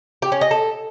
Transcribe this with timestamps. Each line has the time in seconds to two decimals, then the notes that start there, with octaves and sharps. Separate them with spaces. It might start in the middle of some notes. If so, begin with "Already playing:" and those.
0.22 G4
0.32 C#4
0.41 D#5
0.51 A4